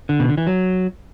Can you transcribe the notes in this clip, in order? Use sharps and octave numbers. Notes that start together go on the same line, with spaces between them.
D3
B2
D3
E3
F#3